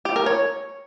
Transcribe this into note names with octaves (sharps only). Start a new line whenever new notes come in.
G4
A#4
C#5